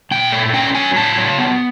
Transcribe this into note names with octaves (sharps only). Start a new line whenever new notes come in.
A#2 G5
A3
C#4 G5
F#3 G#5
A2 A5
F#3
B3